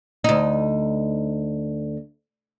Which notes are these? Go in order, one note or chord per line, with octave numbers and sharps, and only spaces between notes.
D2 D#4